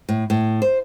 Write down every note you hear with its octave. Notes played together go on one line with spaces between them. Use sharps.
A2
A2
C5